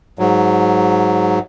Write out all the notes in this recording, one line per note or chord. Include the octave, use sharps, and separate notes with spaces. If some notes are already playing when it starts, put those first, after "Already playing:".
G#2 F#3